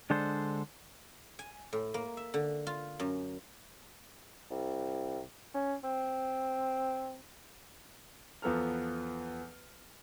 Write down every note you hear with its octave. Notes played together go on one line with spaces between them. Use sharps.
D3 G#3 D4 A4 C5
G#5
A2
A#3
E5
D3
F4
F#2
C2
C#4
C4
E2 F3 B3 A4 A#5 F6